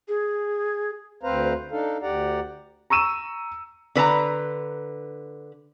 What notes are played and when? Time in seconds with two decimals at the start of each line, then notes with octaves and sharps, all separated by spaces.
0.08 G#4
1.23 D2 C4 B4 C5 F5 A#5
1.71 D4 D#4 A4 F5
2.02 D2 G4 D5 F#5 A#5
2.90 A#5 C#6 E6 D#7 E7
3.95 D3 B4 A5 A#5